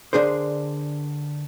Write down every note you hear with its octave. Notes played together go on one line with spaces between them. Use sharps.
D3 D4 G#4 A#4 C5